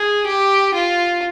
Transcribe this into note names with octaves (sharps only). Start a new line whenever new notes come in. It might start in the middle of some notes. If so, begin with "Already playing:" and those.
Already playing: G#4
G4
F4